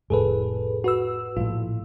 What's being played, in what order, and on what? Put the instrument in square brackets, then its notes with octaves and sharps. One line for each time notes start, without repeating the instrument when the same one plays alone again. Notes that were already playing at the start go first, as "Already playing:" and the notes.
[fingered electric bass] F1 A2 [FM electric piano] G#4 A4 B4
[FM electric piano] F#4 B4 E6
[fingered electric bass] A#1 A2 [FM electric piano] F4